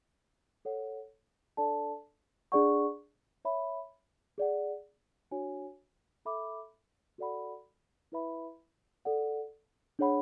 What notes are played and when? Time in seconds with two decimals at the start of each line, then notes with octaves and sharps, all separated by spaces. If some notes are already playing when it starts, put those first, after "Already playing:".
0.65 A4 C#5 F#5
1.57 D4 A4 D5 A5
2.52 D4 G#4 D5 F#5 C#6
3.45 C#5 E5 B5
4.38 G#4 D5 F#5
5.31 D4 F#4 C#5 G#5
6.25 A4 E5 B5 D6
7.18 F#4 A4 D5 F#5 B5
8.12 E4 B4 E5 B5
9.05 A4 D5 F#5
9.99 D4 G#4 C#5 F#5 B5